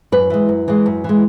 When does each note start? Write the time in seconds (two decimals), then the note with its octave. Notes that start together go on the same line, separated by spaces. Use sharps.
0.12 F#2 B4
0.30 E3 G#3
0.49 F#2
0.68 E3 G#3
0.86 F#2
1.04 E3 G#3